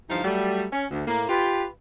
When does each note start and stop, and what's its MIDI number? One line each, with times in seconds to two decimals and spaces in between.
0.10 0.23 43
0.10 0.23 50
0.10 0.23 52
0.10 0.23 53
0.10 0.23 63
0.10 0.23 77
0.24 0.65 54
0.24 0.65 55
0.24 0.65 57
0.73 0.86 61
0.91 1.07 38
1.07 1.26 45
1.07 1.26 58
1.29 1.65 65
1.29 1.65 67
1.29 1.65 71